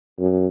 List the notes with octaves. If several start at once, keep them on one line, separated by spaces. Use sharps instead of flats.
F#2